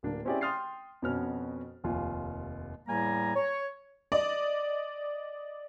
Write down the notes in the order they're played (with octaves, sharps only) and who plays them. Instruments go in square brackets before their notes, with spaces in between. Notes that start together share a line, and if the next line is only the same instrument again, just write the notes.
[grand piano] D1 A#3 D4
C4 C#4 E4 G4 G#4 D5
G5 C6 D#6 F6 A6 C7
F2 B2 B3 C#4 F#4 F6
F1 D#2 F4 G#5
[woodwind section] E2 A2 G3 A#3 G#5 A#5
C#5
[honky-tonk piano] D5 D#5